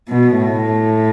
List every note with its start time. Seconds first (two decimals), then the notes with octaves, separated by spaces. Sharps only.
0.09 B2
0.38 A2